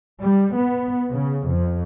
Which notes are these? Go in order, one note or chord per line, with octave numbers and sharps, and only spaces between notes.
G3
B3
C#3
F2